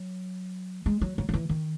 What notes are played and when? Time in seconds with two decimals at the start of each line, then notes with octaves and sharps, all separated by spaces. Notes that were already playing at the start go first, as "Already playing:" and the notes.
Already playing: F#3
0.86 G#3
1.01 F#3
1.18 F#3
1.29 F#3
1.33 E3
1.49 D#3